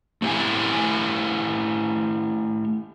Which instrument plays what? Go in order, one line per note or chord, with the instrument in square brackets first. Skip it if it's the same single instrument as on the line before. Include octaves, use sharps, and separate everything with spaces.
[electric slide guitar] A3 E4 G4 F5 G#5